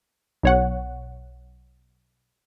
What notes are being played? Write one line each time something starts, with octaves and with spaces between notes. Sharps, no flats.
B1 C#5 F#5